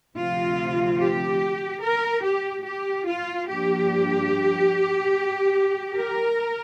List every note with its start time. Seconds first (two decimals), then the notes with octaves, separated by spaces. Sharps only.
0.17 D2 C3 F3 C4 F4
0.99 G4
1.82 A#4
2.24 G4
2.65 G4
3.07 F4
3.48 G2 F3 A#3 D4 G4
5.96 A#4